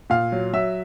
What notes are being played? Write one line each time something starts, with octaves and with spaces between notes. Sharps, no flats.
A#2 F5
F#3
F#3 E5